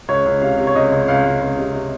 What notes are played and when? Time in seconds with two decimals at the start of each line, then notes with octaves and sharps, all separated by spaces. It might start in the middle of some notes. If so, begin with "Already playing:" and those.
0.08 C#2 C#5
0.26 C#2
0.42 C3 F5
0.58 C3
0.67 C#5
0.75 C#2 D#5
0.92 C#2
1.08 C#2 F5
1.25 C#2
1.41 C#2
1.58 C3
1.75 C3